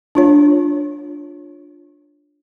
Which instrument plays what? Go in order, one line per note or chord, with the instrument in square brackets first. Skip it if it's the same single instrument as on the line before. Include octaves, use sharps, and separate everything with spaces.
[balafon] D4 F4 C#5